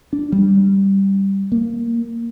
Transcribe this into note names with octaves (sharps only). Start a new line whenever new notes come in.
D4
G3
A#3